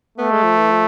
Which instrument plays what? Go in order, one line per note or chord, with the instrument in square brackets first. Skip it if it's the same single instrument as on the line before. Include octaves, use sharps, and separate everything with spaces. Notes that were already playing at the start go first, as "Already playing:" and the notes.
[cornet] A3 [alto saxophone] B3
[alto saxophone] G#3
F3
E3
F3